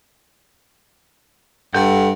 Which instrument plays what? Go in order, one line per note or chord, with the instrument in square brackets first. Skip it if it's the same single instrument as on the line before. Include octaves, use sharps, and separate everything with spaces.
[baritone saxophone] G2 [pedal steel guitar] A4 F#5 G6